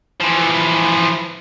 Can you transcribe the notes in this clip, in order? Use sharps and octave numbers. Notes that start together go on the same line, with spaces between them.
E3 F3